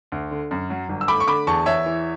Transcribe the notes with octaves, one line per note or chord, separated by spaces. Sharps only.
D2
D3
F#2
F#3
G1
E6
A3 B5 D6
C#6
D3 B5 D6
E2 A5 C#6
E2 C#5 E5
E3